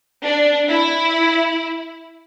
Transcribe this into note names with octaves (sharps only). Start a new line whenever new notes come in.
D4
E4